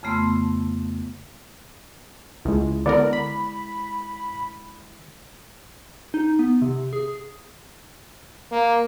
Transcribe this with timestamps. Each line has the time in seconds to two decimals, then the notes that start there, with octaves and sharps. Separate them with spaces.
0.03 F2 C#3 A3 B3 C6 E6
2.45 C#2 G#3 E4
2.86 D3 B3 A#4 D5
3.13 B5
6.14 D#4
6.39 B3
6.62 C3
6.93 G#4
8.51 A#3